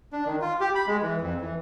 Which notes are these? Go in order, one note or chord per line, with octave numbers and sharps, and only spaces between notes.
D4
D#3
F4
G4
B5
G#3
E3
F2
E3